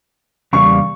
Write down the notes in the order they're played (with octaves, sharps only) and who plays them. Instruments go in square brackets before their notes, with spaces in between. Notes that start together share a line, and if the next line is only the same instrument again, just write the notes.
[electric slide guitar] E2 C#3 G3 A#3 [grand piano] C#6